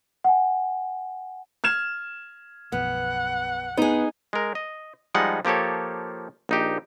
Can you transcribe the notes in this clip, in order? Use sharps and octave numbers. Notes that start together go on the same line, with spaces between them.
F#5 G#5
F6 G#6 E7
B1 F#2 F3 B3 F#5
B3 D#4 G#4
G#3 A#4
D#5
F3 G3 G#3 D#4 F#5
F3 A#3 G4 A4 C#5
A#1 D#4 G4